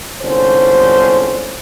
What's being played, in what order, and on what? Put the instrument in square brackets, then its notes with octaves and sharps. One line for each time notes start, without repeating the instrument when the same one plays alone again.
[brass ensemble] G1 C2 D3 G#3 C#4 C5